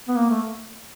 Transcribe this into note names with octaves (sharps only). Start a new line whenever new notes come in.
B3
A#3
A3